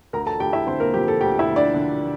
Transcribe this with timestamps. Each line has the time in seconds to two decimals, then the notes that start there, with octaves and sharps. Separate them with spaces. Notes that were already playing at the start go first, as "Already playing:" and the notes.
0.13 D2 A#4 A#5
0.26 A4 A5
0.40 D2 G4 G5
0.53 E4 E5
0.66 D3 C4 C5
0.80 A#3 A#4
0.94 F3 G4
1.08 A4
1.21 D2 G4 G5
1.39 E4 E5
1.48 D2
1.56 D4 D5
1.74 D3